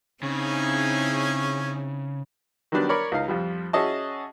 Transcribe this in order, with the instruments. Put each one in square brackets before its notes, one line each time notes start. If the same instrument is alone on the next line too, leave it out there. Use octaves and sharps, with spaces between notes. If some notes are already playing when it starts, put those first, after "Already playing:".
[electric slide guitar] C#3 [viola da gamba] C4 D#4 E4 [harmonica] C#4 G#4 C#5
[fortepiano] D#3 F#3 G3 B3 D4
A#4 C#5 D5 B5
C#2 D#4 F5
F2 F3 G3
C#4 F#4 G#4 D#5 E5 A5